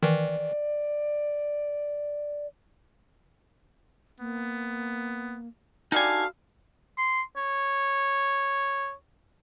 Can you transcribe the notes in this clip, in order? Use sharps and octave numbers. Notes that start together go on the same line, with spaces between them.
D#3 E3 D5
A#3 B3
D3 G3 D#4 F#4 A4 F5 G#5
C6
C#5